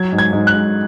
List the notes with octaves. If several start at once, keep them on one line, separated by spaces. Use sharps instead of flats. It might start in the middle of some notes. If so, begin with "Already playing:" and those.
Already playing: F#3 G#6
G#2
G#6
G#2
F#6
G#2